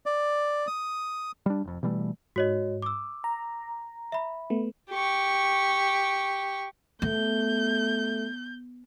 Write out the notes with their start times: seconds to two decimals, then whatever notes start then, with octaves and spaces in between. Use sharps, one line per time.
0.06 D5
0.67 D#6
1.46 G3 D4
1.64 F1 F2
1.83 B2 E3 G3 A3
2.36 G#2 F#4 C#5 D#5
2.82 D6 E6
3.24 A#5
4.12 E5 B5
4.50 A3 B3
4.91 G4 C#6
7.02 A3 B3 G6